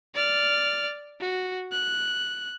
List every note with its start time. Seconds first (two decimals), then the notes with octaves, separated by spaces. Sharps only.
0.15 D5 F6
1.20 F#4
1.72 F#6